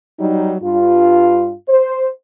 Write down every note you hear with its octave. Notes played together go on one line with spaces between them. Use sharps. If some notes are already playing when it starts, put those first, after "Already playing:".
F#3 G3 D#4
G2 F4
C5